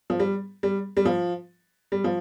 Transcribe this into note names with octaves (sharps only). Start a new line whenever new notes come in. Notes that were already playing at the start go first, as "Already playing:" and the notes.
F3
G3
G3
G3
F3
G3
F3